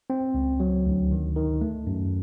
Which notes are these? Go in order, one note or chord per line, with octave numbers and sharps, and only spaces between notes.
C4
C#2
F#3
D2
D#3
D#3
A3
F#2